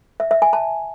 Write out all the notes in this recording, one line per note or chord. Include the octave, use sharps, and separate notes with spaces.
E5
E5
G#5
A5